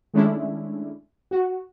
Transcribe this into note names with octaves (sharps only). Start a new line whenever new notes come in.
D#3 G#3 A3 C#4 D4 E4
F#4